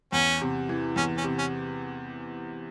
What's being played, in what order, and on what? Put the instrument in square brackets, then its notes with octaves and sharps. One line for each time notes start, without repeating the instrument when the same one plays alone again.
[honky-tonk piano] E2 [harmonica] C#4
[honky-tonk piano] C3
E3
[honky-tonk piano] E2 [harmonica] C#4
[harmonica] C#4
[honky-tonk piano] C3
[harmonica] C#4